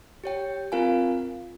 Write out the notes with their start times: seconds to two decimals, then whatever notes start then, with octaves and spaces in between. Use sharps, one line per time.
0.24 G4 C#5 G5
0.72 C4 F4 A#4 F5 G#5